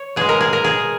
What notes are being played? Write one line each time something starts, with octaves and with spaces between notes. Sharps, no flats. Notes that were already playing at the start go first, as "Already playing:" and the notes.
Already playing: C#5
B2 G#3 G#4
A#4
G#4
A#4
G#4